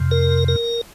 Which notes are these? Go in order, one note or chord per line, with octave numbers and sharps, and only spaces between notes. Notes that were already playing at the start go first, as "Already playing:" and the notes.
Already playing: F2 C3
A#4
A#4